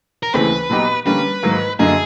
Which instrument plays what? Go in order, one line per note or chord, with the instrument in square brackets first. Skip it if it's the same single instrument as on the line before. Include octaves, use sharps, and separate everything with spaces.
[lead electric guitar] A#4
[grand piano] D#2 C#3 E3 A3 C4 [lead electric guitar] B4
[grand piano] A#2 F#3 B3 D#4 G4
[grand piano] D3 G3 A#3 C#4 [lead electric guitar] B4
[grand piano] G#2 D#3 F#3 A#3
[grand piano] F#2 D3 F#3 A#3 D#4 [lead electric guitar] G#4